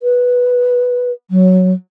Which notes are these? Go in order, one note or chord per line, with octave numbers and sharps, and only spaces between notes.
B4
F#3